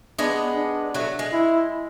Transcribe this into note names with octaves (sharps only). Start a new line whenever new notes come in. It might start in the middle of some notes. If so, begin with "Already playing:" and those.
G#3 B3 D4
D4
F#3 A3
G#3
E4